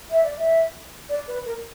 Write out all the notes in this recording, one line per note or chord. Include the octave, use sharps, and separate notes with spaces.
E5
D5
E5
D5
B4
A#4